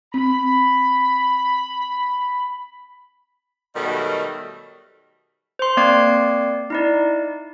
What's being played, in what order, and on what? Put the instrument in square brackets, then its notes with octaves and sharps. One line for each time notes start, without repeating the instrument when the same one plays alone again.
[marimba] C4 [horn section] B5
[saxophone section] B2 D#3 F#3 G3 A3
[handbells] C5 C6
A#3 C4 D5 D6 G#6 C7
D#4 E4 D5